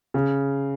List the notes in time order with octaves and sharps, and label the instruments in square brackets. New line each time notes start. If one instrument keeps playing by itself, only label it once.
[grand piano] C#3